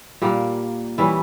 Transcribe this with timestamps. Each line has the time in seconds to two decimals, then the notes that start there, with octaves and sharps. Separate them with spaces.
0.22 A#2 G3 A#3
0.98 E3 G3 C#4 E4